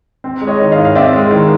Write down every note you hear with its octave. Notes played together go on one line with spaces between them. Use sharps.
C4
G#3
C#5 D#5
D#3
D#5 F5
G#2
F5
C4 D5 E5
G#3
D#3